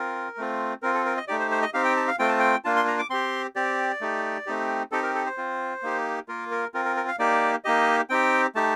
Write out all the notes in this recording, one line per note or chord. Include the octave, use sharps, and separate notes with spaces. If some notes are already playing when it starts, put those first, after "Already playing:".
Already playing: C4 F4 A#4
A3 C4 F4
C4 F4 A#4
A4
A#4
D#5
A3 D#4 G4 D5
C5
C5
D#5
C4 D#4 G4 F5
G5
A5
F5
A3 C4 F4 G5
A5
G5
A#3 D4 F4 A5
C6
A#5
D6
C4 G4 C6
C4 G4 D5
A3 D#4 G4
A3 C4 D#4 G4
C4 D#4 G4 A4
A#4
A4
C5
C4 F4
A#3 D#4 G4
A#3 F4 A#4
A#4
C4 F4 A#4
A#4
A#4
F5
A#3 D#4 G4 D5
A#3 D#4 G4 D#5
C4 D#4 G4 G5
A3 D#4 G4 A5